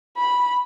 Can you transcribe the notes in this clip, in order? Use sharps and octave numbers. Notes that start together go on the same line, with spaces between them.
B5